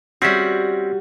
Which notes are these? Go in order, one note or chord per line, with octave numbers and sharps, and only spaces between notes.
G3 C4 C#4 F#4 E5